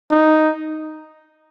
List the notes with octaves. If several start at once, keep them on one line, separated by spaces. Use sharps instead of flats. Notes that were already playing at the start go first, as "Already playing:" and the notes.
D#4